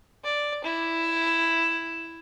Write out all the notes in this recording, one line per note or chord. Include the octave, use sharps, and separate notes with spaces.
D5
E4